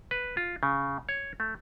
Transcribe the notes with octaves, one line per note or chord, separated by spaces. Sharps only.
B4
F4
C#3
C#5
A3